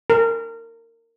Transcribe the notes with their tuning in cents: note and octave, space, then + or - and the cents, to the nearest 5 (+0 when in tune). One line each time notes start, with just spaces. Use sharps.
A#4 -25